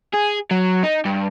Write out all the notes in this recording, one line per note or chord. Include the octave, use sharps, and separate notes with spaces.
G#4
F#3
D#4
G2